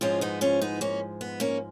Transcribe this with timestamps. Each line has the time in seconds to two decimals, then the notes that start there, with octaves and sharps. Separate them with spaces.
0.01 G#2 F3 G#3 C#4 F4
0.21 B3 D#4
0.41 C#4 F4
0.61 B3 D#4
0.81 A#3 C#4
1.21 B3
1.40 A#3 C#4